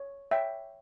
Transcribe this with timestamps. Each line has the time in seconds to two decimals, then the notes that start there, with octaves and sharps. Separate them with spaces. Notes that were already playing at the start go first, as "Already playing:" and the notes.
Already playing: C#5
0.31 C#5 E5 G5